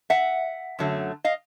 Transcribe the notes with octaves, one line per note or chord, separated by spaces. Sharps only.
E5 F#5
F#2 D3 F#3 A3
D#5 F5